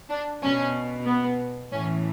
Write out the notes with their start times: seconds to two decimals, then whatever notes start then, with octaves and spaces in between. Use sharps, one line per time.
0.10 D4
0.42 B2 C#4
1.06 B3
1.71 A2 E3 C#4